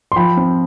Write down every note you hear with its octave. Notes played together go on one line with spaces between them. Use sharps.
C6
F3 G5 B5
C4